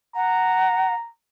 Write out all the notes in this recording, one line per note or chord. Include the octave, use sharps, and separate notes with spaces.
F#5 A#5